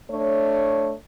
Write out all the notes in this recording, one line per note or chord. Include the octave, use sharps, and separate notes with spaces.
A3 D4 C#5